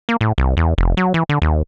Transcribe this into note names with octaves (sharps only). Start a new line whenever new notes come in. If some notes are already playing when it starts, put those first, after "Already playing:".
A#3
A2
C2
E2
F1
F#3
E3
D3
D#2